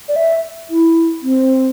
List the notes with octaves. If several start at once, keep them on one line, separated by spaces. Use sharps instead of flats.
D5
E5
E4
C4